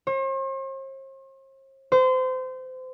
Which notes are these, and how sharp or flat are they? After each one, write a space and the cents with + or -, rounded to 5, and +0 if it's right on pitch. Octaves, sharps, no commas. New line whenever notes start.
C5 +45
C5 -30